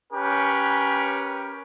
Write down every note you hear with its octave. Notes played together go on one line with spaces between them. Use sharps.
C#4 G4 A#4 B4